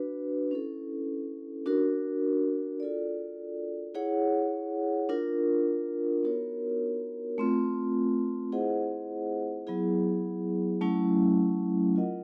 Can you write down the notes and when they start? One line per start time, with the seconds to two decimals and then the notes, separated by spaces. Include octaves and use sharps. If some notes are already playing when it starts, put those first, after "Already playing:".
Already playing: D4 F#4 B4
0.51 C#4 E4 A4
1.66 D4 F#4 A#4
2.80 F4 A4 D5
3.95 E4 G#4 C#5 F#5
5.09 D4 F4 A#4
6.23 B3 D#4 F#4 A#4 C#5
7.38 A3 C4 F4
8.52 E4 G#4 C5 D#5 F#5
9.67 F#3 B3 E4 G#4
10.81 F#3 A3 C#4 E4
11.96 F4 A#4 D#5 F#5